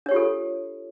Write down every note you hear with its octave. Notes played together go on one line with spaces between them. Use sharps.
D4 F4 G4 A4 C#5